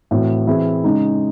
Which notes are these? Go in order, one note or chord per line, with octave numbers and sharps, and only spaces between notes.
A2 E3 C4 F#4
E3 C4 E4 G#4
C#3 G#3 D#4